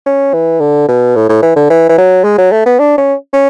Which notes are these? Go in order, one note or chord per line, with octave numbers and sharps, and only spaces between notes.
C#4
E3
D3
B2
A2
A2
E3
D3
E3
E3
F#3
G#3
F#3
A3
B3
D4
C#4
C#4